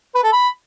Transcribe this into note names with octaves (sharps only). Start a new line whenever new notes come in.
B4
A4
B5